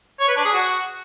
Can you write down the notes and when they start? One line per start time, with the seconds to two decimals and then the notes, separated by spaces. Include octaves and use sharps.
0.20 C#5
0.28 B4
0.36 D4
0.45 G#4
0.53 F#4